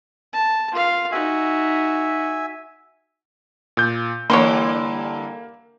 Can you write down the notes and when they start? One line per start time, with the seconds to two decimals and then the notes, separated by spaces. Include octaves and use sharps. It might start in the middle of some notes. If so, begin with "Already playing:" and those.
0.33 A5
0.72 F4 F5
1.12 D#4 F#4 E5 G#5
3.77 A#2 G6
4.30 G2 D3 E3 A#3 C#5 F#5 C6